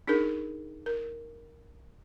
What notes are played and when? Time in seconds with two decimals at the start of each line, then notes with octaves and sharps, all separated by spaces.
0.08 D4 D#4 G#4 A#4
0.86 A#4